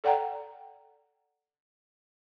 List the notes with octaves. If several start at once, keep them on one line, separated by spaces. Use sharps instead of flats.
A4 D5 F#5 G5 A#5